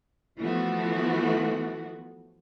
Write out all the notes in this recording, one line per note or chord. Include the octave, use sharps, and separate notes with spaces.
E3 F3 A3 B3 F#4